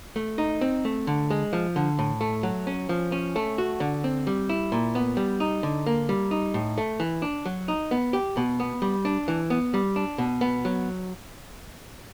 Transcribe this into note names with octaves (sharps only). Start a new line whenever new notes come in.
A3
D#4
C4
A3
D3
G#3
F3
D3
A2
A3
F#3
C#4
F3
C#4
A3
F#4
D3
C4
G3
E4
A#2
B3
G3
D#4
D3
A#3
G3
D#4
A2
A3
E3
D4
F#3
D#4
B3
G4
B2
B3
G3
D4
E3
B3
G3
D4
B2
B3
F#3